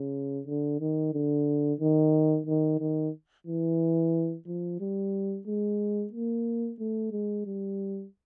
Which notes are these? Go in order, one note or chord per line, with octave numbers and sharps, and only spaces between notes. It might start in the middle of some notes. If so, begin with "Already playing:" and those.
Already playing: C#3
D3
D#3
D3
D#3
D#3
D#3
E3
F3
G3
G#3
A#3
A3
G#3
G3